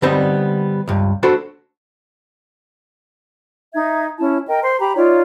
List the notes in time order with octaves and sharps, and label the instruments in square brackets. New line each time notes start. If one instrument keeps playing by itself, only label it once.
[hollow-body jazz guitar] D3 G3 B3 C4 D#4
C#2 G2
D4 F#4 A4 C5 B5
[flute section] D#4 E5 G#6
C#4 E4 A5
A#4 D#5 G5
C5 C6
G4 A#5 B5
D#4 F4 C#5 D5